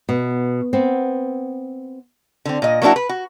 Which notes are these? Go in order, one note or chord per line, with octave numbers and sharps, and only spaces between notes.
B2
B3 C4
D3 C4
A#2 D#5
F#3 A#3 B3 D4 E4 F#4
B4
F#4